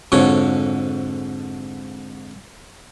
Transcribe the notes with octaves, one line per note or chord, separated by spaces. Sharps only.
F2 G#2 D3 F#4 C#5